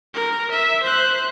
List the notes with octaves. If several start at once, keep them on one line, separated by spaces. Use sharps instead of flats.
A#4
E5
C5 F#6